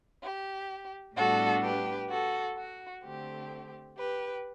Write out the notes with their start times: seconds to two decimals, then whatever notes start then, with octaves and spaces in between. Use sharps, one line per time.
0.22 G4
1.15 A2 G3 B3 D4 F#4 A4
1.62 G4 B4
2.09 F#4 A4
2.56 F#4
3.03 D3 A3 C4 G4
3.97 G4 B4